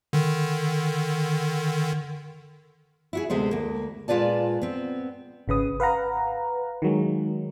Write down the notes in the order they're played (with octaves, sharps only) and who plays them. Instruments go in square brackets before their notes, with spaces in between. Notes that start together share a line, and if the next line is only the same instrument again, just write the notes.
[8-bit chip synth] D3 D#3
[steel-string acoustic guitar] E4 F#4 G#4
D2 C3 G#3 B3 C5
D2 A#3
A#2 G#3 F4 B4 D5 A5
B3 C4
[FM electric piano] G#1 C#3 B4 D#6
B4 F5 F#5 A#5
D#3 F#3 G#3